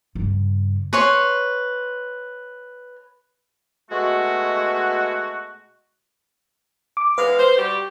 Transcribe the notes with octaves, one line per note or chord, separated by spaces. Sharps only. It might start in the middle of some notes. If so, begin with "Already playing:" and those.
G2 C#3
B4 C#5 C6
B2 G#3 A3 F#4
D6
E2 G#3 B4 F5
C5
G3 F#4 G4